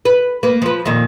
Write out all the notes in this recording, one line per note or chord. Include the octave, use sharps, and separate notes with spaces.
B4
A#3 B4
F3 B4
F2 A#2 D#3